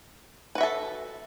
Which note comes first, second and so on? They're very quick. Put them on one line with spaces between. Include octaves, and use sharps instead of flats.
B4 F#4 E5 A4